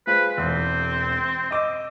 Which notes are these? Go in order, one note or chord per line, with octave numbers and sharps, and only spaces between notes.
G#3 F4 B4 C5
E1 E2 C4
D#5 D6 E6